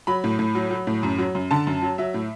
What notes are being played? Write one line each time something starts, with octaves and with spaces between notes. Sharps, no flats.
F#3 B5
A2
A2
F#3
F#3
A2
F#2
F#3
F#2
D3 A5
F#2
F#3
F#3 E5
A2